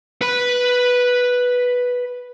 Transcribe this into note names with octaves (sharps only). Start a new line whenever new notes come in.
B4 B5